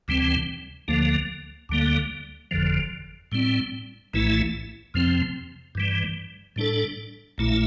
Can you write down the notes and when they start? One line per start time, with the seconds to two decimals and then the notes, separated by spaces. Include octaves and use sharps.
0.08 D2 C3 E3 G3 C4
0.88 D2 D3 F3 A#3
1.69 D2 D3 G3 A#3
2.51 G1 F2 D3 F3
3.32 A2 G3 C4
4.13 A#1 A2 E3 A3 E4
4.94 F2 C3 F3 C4
5.75 G2 E3 G3
6.56 A2 G3 D4 A4
7.38 A#1 A#2 A3 E4